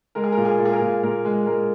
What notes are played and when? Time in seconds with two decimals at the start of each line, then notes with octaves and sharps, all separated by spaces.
0.15 G#3 A#4
0.24 G#4
0.32 A#2 A#4
0.45 G#4
0.59 A#2
0.65 G#4
0.73 A#4
0.81 A#2
1.03 A#2 A#4
1.25 G#3
1.46 G#3 A#4